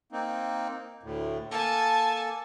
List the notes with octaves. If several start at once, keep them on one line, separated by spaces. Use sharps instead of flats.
A#3 C4 D#4
D2 A2
A#3 A4 G#5 A5